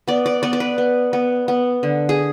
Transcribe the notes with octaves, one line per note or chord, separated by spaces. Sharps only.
B3 D5
D5
B3 D5
D5
B4
B3
B3
B3
D3
G#4